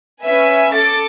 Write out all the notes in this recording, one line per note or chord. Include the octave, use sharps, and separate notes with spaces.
C#4 B4 E5 G#5
A4 D6 A6